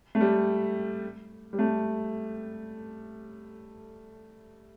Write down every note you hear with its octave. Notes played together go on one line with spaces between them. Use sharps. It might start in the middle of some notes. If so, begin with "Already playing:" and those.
A3
G3
G3
A3